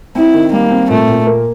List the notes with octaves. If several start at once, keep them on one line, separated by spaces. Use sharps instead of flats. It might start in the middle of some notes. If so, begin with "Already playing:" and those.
C4 E4
D#3
G3 A#3
C4
A#2 A3
A#2
A#3